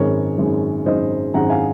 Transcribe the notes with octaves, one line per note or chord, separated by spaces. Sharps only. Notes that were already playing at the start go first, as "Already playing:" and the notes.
Already playing: G#1 F#2 D#3 G#3 A#4 C#5
G#1 F#2 D#3 G#3
G#1 F#2 D#3 G#3 C5 D#5
G#1 F#2 D#3 G#3 F#5 A#5
F5 G#5